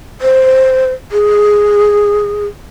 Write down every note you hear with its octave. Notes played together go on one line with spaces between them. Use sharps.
C5
G#4